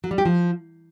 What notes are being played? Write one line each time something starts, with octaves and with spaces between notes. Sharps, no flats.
F#3
G3
G4
F3